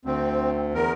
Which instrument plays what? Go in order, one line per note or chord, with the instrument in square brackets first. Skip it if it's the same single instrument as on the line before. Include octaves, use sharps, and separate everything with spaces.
[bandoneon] D2 [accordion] C4
[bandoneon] E2 [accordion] A#4